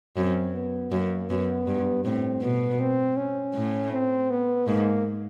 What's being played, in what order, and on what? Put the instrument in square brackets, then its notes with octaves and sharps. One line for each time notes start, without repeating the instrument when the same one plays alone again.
[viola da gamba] F#2 [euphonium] C4
[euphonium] B3
[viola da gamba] F#2 [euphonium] A#3
[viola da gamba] F#2 [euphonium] B3
[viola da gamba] G2
[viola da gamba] A2 [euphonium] C4
[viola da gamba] B2 [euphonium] B3
[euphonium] C4
C#4
[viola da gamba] A2
[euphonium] C4
B3
[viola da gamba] G#2 [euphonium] A#3